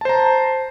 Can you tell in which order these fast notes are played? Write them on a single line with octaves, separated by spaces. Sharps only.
A5 C5 A#5